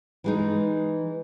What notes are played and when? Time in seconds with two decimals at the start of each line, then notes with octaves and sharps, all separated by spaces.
0.24 E3 G#3 D#4